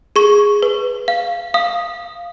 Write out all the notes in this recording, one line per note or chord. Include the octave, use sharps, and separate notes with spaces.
G#4 C#6
B4
F5
F5 D#6